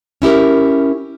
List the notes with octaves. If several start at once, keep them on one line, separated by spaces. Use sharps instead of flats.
C#4 E4 G4 A#4